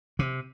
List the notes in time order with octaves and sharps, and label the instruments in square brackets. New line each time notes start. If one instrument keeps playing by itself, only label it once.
[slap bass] C3